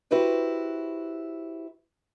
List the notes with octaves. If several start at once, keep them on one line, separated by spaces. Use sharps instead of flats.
E4 F#4 G4 B4 C5